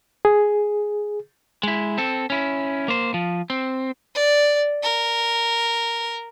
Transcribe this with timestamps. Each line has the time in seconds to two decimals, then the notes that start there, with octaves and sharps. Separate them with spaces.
0.25 G#4
1.63 G#3 E4
1.98 C4 A4
2.30 C#4 E4
2.88 A#3 C5
3.14 F3
3.50 C4
4.14 D5
4.83 A#4